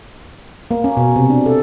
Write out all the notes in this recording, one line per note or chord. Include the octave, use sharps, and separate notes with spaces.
A#3
C#4
B2
C3
D4
A4